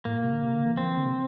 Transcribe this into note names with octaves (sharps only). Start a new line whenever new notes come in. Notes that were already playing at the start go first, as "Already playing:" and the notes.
A2 A#3
A#2
C3
D3
C3
D3
E3
F3 C4
E3
D3
C3